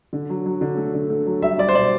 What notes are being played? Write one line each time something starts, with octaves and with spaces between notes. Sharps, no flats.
D3
F#3
F#3
D3
A3
D3
A3
F#3
G3 E5
G3 D5
C5
B2 D5